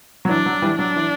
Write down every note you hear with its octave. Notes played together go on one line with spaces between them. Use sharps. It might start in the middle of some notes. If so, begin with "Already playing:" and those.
F#3
E3 D4
F#3
E3 G3
F#3 D4
E3